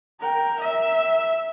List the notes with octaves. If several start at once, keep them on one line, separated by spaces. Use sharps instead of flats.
A#4 G5
E5